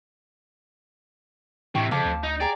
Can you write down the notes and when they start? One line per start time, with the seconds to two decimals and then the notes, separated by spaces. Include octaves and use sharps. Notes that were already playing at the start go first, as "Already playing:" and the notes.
1.75 A2 C3 E3 G5 C#6 D6
1.91 F2 C#3 F5 A5 D6
2.05 D2
2.23 D#4
2.40 G4 G#4 D5 A#5